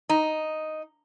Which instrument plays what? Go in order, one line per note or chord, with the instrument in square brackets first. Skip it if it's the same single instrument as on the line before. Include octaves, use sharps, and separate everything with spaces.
[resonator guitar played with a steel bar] D#4